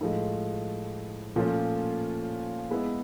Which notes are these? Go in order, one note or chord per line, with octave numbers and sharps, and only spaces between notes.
A2 F3 G#3
A#2 F3 A3 C#4 F4
G#3 B3 E4 G#4